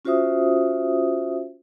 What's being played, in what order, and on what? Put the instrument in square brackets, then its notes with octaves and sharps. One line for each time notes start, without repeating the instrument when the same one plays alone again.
[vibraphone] C#4 F4 F#4 C5 E5 D#6